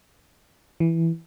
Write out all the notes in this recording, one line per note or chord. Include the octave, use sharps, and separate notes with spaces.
E3